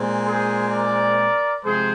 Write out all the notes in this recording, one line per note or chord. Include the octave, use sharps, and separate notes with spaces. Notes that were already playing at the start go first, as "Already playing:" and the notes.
Already playing: A#2 G#3 C4
G#4 C5
A#4 D5
C3 F3 G#3 G#4 C5